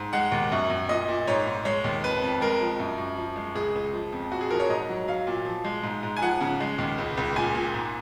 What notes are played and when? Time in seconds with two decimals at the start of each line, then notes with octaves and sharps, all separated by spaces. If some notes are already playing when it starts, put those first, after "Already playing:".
Already playing: G#2
0.13 G#3 F#5
0.32 D#2
0.52 F#2
0.70 F#2
0.89 A#2 D#5
1.08 A#2
1.27 G#2 C#5
1.47 G#2
1.65 G#3 C#5
1.84 D#2
2.03 F2 B4
2.22 F2
2.41 G#3 A#4
2.61 F3
2.79 F#2
2.98 F#2
3.17 F3
3.36 G#3
3.55 C#2 G#4
3.75 C#2
3.93 F3
4.12 F2
4.32 A#2 F#4
4.41 G#4
4.50 F3 A#4
4.60 C#5
4.69 G#2 D#5
4.89 F#3
5.08 F#3 F5
5.27 A#2
5.45 F3
5.65 G#3
5.83 G#2
6.03 G#2
6.17 G#5
6.22 F3 F#5
6.41 C#3
6.61 G#3
6.78 D#2
6.98 C#2
7.17 C#2
7.36 A#2 G#5
7.54 A#2
7.74 G#2